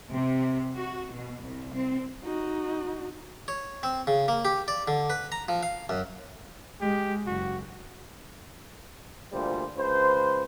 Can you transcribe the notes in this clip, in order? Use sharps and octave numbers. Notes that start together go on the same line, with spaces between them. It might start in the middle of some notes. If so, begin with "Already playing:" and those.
C3
F#4
B2
C2
C4
D#4 F#4
C#5
C4
C#3
A#3
G4
D5
D3
B4
A#5
F3
F5
F#2
G#3 G4
F#1 F#4
D2 A#2 G3 F4 C5
C#2 B4 C5